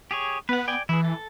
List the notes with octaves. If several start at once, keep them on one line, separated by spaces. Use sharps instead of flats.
G4 G#4 C#5
B3 B4 F#5
D5 G5 G#5
E3 E4 G#4
A4